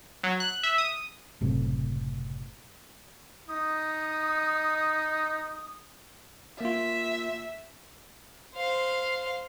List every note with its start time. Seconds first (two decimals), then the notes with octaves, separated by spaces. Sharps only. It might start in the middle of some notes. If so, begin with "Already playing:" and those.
0.24 F#3
0.40 F#6
0.63 E5
0.78 D#6
1.41 F#1 A2 C3
3.48 D#4 D#6
6.61 A#3 F4 E5
8.55 C5 F5